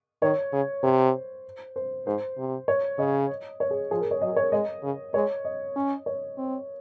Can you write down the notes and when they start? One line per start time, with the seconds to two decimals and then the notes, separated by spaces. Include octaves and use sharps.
0.22 D#3 C#5
0.52 C#3
0.83 C3 C5
1.76 C5
2.06 G#2 C5
2.37 C3
2.68 C#5
2.98 C#3 D#5
3.60 C#5
3.71 G#4
3.91 F3 G#4
4.01 A#4
4.11 C#5
4.21 F#3 D#5
4.36 C#5
4.52 G#3 D#5
4.83 C#3
5.14 G#3 C#5
5.45 D#5
5.76 C#4
6.06 C#5
6.37 C4